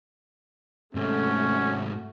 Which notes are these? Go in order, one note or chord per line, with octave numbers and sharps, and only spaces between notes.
G#2 C3 A3 C#4 F#4